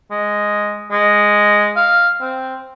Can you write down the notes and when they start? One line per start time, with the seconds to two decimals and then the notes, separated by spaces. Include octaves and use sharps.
0.11 G#3
0.91 G#3
1.76 F5
2.21 C4